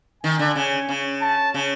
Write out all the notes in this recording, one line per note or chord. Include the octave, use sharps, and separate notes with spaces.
D#3 G#5
D3
C#3
C#3
A5
C#3